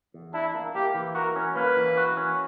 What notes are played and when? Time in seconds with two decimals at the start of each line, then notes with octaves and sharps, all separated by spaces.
0.14 E2
0.34 D4 E4
0.55 A#3
0.75 A#3 G4
0.95 E3
1.15 F#4 A#4
1.36 C#4
1.56 A#3 B4
1.76 E3
1.97 F#4
2.17 C#4